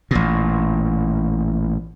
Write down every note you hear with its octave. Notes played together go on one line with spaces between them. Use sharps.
A1 A#2